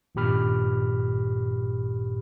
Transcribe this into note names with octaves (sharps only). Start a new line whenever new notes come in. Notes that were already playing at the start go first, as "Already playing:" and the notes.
G#1 G2 A#2 G4 B5 F6